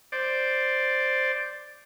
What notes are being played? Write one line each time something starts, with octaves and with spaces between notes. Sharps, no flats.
C5 D5